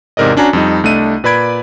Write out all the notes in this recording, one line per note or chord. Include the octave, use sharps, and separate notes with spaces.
E2 G#2 C3 A#4 D5 D#5
C#4 D4 F#4 G#5 A#5
F2 G3 D#4
C2 A3 D4 D#5 D#7
A#2 B4 D5 B5 G#6 D7